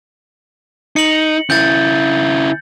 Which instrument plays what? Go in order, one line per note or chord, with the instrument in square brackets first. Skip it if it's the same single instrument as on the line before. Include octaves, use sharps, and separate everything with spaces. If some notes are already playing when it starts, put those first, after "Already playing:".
[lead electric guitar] D#4 [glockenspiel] C#7 F#7
[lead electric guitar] C#3 E4 [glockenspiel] G6 A6